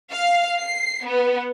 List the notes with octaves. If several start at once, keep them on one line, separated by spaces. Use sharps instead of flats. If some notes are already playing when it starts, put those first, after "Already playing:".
F5
C7
B3